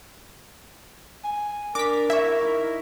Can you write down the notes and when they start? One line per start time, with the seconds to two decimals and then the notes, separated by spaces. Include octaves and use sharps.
1.24 G#5
1.75 D4 A#4 D6 B6
2.10 E4 E5 C#6
2.43 D#4 E4